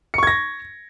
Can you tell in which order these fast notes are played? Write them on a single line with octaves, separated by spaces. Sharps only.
C#7 C#6 G#6 A#6